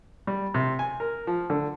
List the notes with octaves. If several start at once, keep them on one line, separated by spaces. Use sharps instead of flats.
G3
C3
G#5
A#4
F3
D3